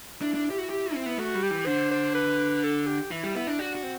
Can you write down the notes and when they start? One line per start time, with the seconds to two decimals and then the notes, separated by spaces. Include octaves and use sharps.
0.22 D4 E4
0.34 D4
0.50 G4
0.58 F#4
0.70 G4
0.94 C4
1.06 B3
1.18 A3 F#4
1.35 G3
1.43 G4
1.51 E3
1.66 D3 C5
1.91 C5
2.15 B4
2.63 A4
2.86 G4
3.11 E3 E4
3.23 G3
3.35 B3 E4
3.47 D4
3.59 D4 F#4
3.75 F#4
3.83 C4